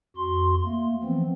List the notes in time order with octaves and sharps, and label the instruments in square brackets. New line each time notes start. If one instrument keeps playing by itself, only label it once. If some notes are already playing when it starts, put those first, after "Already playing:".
[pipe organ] F2 F#4 C6
A3 A#3
E3 F3 B3 C4